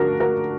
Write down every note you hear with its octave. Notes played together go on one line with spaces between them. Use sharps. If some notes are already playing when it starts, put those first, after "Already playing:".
Already playing: D2 D3 F3 D4 F#4 A#4
F#4 A#4